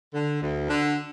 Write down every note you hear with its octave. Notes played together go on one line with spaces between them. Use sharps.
D3
D2
D3